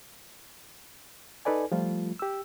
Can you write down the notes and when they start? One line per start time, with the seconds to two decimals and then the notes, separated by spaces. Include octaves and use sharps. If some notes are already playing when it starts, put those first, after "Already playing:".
1.45 D#4 A4 B4 D5 G#5
1.72 F3 G3 A3 F4
2.19 G4 E6